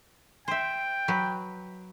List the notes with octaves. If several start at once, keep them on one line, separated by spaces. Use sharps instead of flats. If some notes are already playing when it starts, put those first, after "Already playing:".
C5 E5 G5
F#3 B4